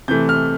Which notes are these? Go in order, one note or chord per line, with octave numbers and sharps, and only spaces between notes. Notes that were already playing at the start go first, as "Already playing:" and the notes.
C3 E3 A3 G6
F6